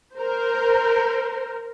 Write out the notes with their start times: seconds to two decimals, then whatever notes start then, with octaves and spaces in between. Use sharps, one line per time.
0.14 A#4 C5